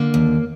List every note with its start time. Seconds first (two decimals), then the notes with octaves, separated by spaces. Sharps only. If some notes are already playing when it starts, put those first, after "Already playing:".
Already playing: D3 A#3
0.14 D#2